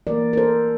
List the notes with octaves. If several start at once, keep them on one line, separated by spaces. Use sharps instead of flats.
E3 A#3 A#4 D5
A#4
A4 C5